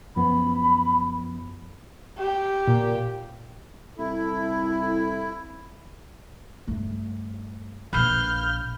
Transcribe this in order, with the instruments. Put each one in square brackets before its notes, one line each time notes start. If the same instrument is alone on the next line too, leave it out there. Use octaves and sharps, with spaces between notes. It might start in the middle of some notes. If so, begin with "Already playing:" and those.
[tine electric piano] F#2 F3 B3 [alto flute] B5
[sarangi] G4
[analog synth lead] A#2
[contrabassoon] C2 [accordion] E4 [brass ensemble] A4
[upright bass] G2 A3
[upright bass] A#1 A#2 [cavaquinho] B4 F5 [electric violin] F6 G6